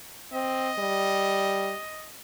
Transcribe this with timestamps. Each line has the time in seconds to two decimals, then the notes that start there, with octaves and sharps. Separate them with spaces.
0.33 C4 D#5
0.78 G3